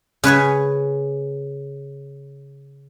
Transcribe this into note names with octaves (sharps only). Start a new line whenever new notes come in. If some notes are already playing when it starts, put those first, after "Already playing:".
C#3 B4 C#5 G#5